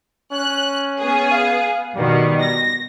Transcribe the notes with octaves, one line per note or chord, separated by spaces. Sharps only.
C#4 F#6
B3 G#4
F5
B2 D#3 G3
A#6